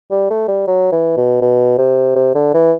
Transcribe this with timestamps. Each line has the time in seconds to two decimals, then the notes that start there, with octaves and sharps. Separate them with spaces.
0.11 G3
0.30 A3
0.48 G3
0.67 F#3
0.92 E3
1.17 B2
1.42 B2
1.78 C3
2.16 C3
2.35 D3
2.54 E3